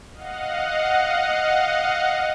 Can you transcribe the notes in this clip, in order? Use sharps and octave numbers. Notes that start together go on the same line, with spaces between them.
D#5 F5 F#5